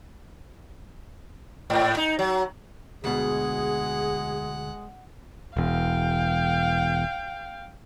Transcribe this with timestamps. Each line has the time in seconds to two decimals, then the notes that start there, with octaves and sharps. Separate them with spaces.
1.70 G#2
1.97 D#4
2.19 F#3
3.04 D2 B2 G#3 G#4 F#5
5.57 E1 E2 F5 G5